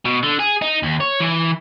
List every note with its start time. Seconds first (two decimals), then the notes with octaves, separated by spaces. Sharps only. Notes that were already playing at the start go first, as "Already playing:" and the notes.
0.05 B2
0.23 D3
0.39 G#4
0.62 D#4
0.83 D#2
1.01 C#5
1.21 E3